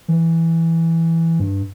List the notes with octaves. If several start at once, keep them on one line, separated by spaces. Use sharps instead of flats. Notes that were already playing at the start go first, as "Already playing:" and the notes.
E3
G2